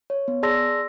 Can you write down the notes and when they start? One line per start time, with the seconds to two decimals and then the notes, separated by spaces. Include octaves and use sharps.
0.10 C#5
0.28 B3
0.43 G#4 D5 A5 C6 E6 A#6